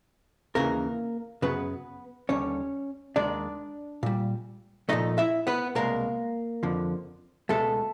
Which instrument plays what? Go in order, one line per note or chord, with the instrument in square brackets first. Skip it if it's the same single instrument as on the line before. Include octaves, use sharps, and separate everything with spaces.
[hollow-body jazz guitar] D#2 C#3 E3 A#3 A#4
F#2 C#3 F#3 B3 B4
D#2 D3 G3 C#4 C#5
D#2 D#3 G#3 D4 D5
A#2 G3
A#2 F3 A3 D#4 D#5
E4 E5
B3 B4
C2 B2 G#3 A#3 A#4
F2 D3 F3
C#2 B2 G#3 A3 A4